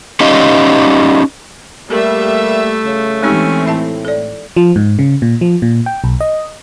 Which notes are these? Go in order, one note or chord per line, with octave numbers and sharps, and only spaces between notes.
C#4 D#4 G4 D#5 F5
G3 A3 A#3 A4 A#4 E5
A4
C#3
E3 G#3 C4 C#4 D#4 G4
A2 E4 E5 A5
A4 D5
F3
G#2
C#3
A#2
F3
A#2
G5
B1
D#5